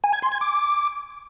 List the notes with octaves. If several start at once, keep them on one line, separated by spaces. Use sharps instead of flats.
G#5
G#6
C6
G#6
D6